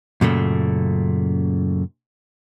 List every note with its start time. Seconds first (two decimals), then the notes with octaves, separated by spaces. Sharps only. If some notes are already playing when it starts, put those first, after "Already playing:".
0.21 F#2 A#2 C#3 A3